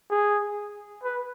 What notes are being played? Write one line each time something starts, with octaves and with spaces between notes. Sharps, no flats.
G#4
B4